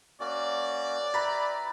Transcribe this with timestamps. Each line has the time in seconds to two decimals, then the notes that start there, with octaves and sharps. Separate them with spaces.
0.20 A#3 C#4 F#4 D5
1.14 E4 G4 B4 A#5 B5 A6